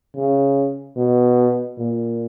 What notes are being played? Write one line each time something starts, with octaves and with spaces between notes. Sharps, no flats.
C#3
B2
A#2